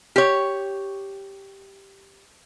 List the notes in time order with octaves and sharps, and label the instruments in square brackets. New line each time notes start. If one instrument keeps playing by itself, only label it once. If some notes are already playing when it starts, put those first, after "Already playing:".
[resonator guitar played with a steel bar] G4 C#5